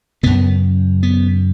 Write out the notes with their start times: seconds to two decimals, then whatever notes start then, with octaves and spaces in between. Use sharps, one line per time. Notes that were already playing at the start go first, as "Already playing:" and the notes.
0.23 F#2 C#3 B3
1.03 B3